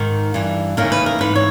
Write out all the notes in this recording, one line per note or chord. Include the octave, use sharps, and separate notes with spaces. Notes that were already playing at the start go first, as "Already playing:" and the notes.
Already playing: G#2 D#3 A#4
G2 E3
D#2 C#3 E3 A#4
B4
A#4
G#2 E3 B4
C#5